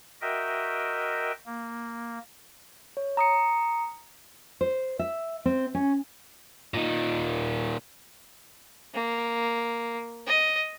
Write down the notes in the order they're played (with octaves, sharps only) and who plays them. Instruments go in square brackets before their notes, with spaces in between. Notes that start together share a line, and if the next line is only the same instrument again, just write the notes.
[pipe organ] F#4 A#4 D#5 E5 G5
A#3
[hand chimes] C#5
A#5 D#6 C#7
[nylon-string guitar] C5
E5
C4
C#4
[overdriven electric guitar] A#2 D#3
[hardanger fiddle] A#3
D#5